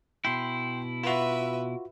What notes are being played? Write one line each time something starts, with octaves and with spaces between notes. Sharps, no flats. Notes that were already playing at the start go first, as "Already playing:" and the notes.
B2 E4 G5 C6
F4 F#4 B4 E5